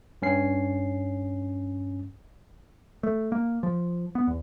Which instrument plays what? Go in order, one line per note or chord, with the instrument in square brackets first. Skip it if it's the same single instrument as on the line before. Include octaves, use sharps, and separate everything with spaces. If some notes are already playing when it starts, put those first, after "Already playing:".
[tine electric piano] G2 C#4 C7
[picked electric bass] A3
A#3
F3
B3
E2